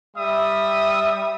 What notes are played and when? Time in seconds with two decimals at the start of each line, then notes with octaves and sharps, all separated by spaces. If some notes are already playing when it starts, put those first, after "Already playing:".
0.17 G3 E5 D#6